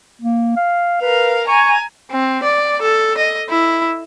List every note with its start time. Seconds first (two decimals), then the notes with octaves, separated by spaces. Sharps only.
0.21 A#3
0.56 F5
1.02 A#4 B4 F5
1.48 G#5 A#5 C#6
2.11 C4
2.43 D5
2.82 A4
3.18 D#5
3.50 E4